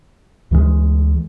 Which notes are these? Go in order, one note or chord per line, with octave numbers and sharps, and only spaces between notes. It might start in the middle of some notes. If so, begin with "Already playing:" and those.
D2 E3 F#3 G#3